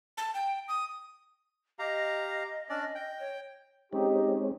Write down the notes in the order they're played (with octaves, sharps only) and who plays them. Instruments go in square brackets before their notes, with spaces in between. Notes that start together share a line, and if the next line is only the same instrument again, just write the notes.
[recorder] A5
G5
D#6
[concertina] G4 F5 A#5 [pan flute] D#5
[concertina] C#4 D4 D5
G5
[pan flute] C#5
[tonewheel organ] G#3 C4 C#4 [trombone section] D#4 G4